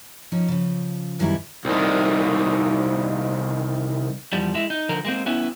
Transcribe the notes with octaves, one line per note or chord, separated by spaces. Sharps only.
F3 C#4 D#4
C#3 F3
F#2 D#3 F#3 G3 B3 E4
C2 D#3
E2 F3 G3
G#3 E4
D#4
D3 F3 A#4
G#3 A#3 C4
B3 C#4 E4